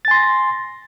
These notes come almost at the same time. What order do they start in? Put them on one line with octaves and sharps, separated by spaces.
A6 G#5 C6 A#6